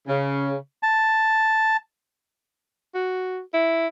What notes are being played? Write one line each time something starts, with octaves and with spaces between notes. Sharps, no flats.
C#3
A5
F#4
E4